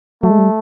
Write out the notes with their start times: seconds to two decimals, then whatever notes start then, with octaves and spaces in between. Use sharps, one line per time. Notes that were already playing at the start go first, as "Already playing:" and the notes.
0.23 F#3 A3
0.30 G#3
0.39 G3